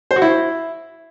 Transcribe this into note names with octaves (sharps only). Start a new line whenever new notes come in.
C5
F#4
E4